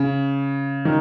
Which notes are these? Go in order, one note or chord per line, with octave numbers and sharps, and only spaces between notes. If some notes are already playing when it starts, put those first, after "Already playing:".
Already playing: C#3
D#3